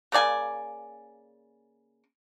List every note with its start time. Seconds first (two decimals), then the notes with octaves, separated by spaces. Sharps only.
0.12 C#3 A#3 D5 G#5